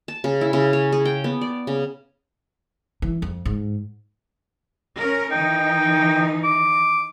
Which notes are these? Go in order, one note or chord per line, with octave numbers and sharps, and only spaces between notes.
A5
C#3
E4
C#3
C#5
G#4
G5
B3
D5
C#3
E3
F2
G#2
C#4 A#4
D#3 E3 D#4 G5
D6